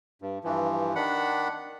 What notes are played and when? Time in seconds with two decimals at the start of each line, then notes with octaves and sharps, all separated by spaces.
0.22 G2
0.44 G2 E3 F3
0.95 D#3 D4 F#5 B5